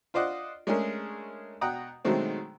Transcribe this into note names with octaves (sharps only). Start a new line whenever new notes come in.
F4 C5 D5 D#5 F#5
G#3 A3 C#4 D4 G#4 A#4
B2 F#5 G5 A#5 D#6
B2 D#3 F#3 G#3 A3 C4